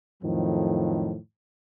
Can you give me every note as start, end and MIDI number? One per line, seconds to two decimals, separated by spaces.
0.23 1.16 41
0.23 1.16 45
0.23 1.16 51
0.23 1.16 53
0.23 1.16 54